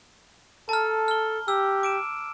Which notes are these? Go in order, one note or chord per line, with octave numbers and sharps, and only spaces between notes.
A4 A5 A#5 F6
F6 G7
G4 E6
D6 D7 E7